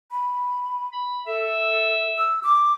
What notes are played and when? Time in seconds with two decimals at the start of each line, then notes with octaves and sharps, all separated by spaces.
0.11 B5
0.92 B5
1.27 A4 E5
2.18 E6
2.43 D6